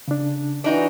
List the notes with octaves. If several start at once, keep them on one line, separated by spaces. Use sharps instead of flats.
C#3 D4
E3 D4 D#4 F#4